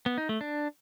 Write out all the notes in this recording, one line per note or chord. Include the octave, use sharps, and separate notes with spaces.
B3
D#4
A3
D4